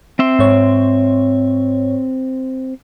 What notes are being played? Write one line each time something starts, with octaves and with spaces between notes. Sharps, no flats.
C4 E5 C6
G#2 C#5